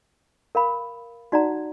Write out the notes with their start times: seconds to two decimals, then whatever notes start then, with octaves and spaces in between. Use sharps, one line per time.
0.55 A#4 F5 B5
1.32 D#4 F#4 D5 F#5 A#5